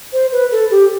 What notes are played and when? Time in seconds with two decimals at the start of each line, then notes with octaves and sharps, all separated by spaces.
0.13 C5
0.32 B4
0.52 A4
0.71 G4